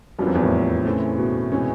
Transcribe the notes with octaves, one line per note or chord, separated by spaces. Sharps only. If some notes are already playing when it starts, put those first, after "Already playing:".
F#2 G3 B3 D4 F4 A#4
F2
E2
A2
C#3 E3 A3 C4
B2
C3 E3 G#3 C#4